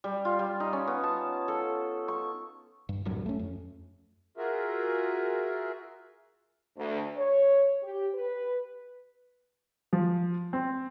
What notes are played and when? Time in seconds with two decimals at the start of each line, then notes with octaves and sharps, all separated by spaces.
0.04 G3
0.25 F4
0.39 G3
0.60 D#4
0.73 C#4
0.87 B3
1.03 A5
1.48 A4
2.08 C#6
2.89 G2
3.05 D1 A#1 G2 F#3
3.26 A3 C#4
3.39 F2
4.37 F4 F#4 G#4 A#4 E5
6.77 D2
7.16 C#5
7.83 G4
8.14 B4
9.93 F3
10.53 C4